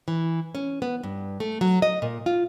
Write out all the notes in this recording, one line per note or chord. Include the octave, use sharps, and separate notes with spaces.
E3
C#4
B3
G2
A3
F#3
D#5
A#2
F4